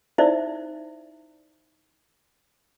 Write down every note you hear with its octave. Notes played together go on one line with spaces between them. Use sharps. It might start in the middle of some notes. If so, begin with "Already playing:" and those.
D#4 E4 C5 D5 E5